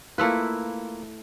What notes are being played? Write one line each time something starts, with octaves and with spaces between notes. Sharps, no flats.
A3 A#3 E4 F4 B4